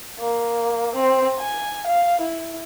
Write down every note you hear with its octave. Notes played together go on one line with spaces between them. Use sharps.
A#3
C4
G#5
F5
E4